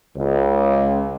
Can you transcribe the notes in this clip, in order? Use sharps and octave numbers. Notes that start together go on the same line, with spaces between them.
C#2